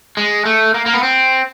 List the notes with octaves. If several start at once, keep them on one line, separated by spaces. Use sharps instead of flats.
G#3
A3
A#3
A#3
B3
C4